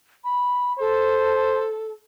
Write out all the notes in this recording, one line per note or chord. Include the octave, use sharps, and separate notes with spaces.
B5
A4 C5